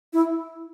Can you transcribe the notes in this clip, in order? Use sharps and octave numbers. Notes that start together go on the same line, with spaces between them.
E4